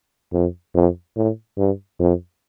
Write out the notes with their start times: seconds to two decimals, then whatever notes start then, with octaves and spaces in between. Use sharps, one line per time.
0.33 F2
0.75 F2
1.16 A2
1.57 G2
2.00 F2